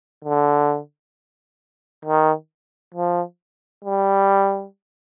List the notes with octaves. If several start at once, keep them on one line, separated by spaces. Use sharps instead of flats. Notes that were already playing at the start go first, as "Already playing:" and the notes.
D3
D#3
F3
G3